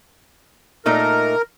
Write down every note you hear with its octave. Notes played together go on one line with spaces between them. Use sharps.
A#2 A3 D#4 A#4